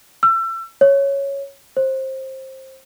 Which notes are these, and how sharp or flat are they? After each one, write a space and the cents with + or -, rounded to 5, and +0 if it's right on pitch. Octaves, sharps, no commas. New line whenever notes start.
E6 +30
C#5 +0
C5 +20